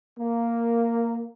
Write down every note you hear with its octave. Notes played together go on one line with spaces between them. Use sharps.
A#3